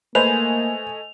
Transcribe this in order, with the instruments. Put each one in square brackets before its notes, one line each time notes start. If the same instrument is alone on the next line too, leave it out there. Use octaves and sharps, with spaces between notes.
[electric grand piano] A3 D#5 G#5 [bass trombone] A#3 [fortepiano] B4 C5 [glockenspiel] F7